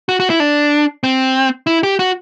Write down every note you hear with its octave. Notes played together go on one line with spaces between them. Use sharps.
F#4
F#4
E4
D4
C4
E4
G4
F#4